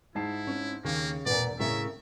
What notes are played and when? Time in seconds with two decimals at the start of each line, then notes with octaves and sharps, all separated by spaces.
0.15 G#2 E4 A5 C7
0.47 C#4
0.85 D#2 C#3 A#3
1.26 E1 A#2 B3 D5
1.59 A2 C#3 A#4 E5